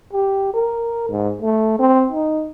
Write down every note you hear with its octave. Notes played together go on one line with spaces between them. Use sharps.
G4
A#4
G#2
A3
C4
D#4